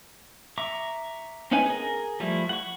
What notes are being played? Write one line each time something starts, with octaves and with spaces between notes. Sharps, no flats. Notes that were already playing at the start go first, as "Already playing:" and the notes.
E5 A#5 C#6 D6
C4 C#4 D#4 B4 G#5
G#4 A#4
F3 G3 A3 E4
F#5 C#6